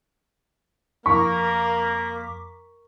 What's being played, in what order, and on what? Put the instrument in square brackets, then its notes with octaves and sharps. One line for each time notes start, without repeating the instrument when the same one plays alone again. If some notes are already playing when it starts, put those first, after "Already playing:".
[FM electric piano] F2 D6 B6 [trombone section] A#3 [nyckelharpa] A#4 [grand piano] C#6